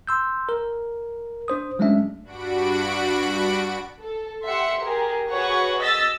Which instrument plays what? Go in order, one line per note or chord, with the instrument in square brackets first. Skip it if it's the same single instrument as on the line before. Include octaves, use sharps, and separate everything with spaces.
[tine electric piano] C6 E6 G6
A#4
D4 C5 D#6
F#3 G#3 A3 C#4 D4 E5
[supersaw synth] G2 D4 F#4 F#5 B5 D7
[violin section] A4
G4 E5 F#5 C6 C#7
G4 G#4 A#4
F#4 G#4 B4 C#5 F#5 C#6
D#5 E6 A6 B6